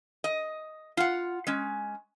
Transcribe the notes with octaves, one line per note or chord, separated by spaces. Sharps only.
D#5
F4 F#5
G#3 C#4